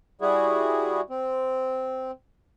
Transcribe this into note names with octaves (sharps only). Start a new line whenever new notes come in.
G3 E4 F#4 G#4
C4